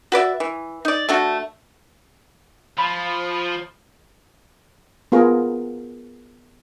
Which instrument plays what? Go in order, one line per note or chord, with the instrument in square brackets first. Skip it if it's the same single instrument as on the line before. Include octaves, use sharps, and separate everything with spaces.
[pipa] F#4 B4 D5 E5
E3
D#4 D5
A3 D4 F#4
[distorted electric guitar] F3 [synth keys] B5
[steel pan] B3 F4 G#4 A#4 A#5